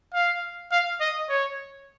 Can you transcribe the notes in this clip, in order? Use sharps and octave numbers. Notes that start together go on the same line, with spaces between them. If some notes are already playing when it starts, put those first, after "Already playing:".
F5
F5
D#5
C#5